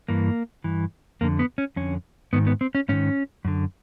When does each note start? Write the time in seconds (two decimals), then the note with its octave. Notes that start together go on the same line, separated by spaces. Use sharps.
0.09 G2 E3 A#3
0.64 G2 E3
1.21 F2 D3 A#3
1.39 B3
1.58 C#4
1.76 F2 D3 C#4
2.33 G#2 D#3 B3
2.47 B3
2.61 C4
2.75 C#4
2.89 G#2 D#3 C#4
3.45 F#2 D3